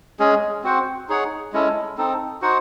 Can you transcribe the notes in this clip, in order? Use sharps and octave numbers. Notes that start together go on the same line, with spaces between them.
G#3 C#4 G#4
C4 F#4 C5 F#5
D#4 G#4 C#5 F#5
G#3 C#4 E4 A4
C4 D#4 A4
D#4 F#4 C5 F#5